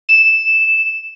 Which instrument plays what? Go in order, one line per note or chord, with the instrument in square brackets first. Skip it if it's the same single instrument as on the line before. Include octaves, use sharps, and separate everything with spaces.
[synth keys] E7